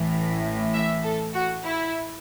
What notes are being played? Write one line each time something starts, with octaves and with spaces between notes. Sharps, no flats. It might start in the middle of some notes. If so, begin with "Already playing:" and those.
Already playing: A1 A2 E3
E5
A4
F#4
E4